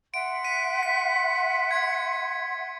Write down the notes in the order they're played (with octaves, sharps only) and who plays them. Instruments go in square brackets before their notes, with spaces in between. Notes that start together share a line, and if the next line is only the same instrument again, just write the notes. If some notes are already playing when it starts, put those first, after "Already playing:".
[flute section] E5 F#5 C6 [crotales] D7
[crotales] B6 D#7
B6
G#6 C#7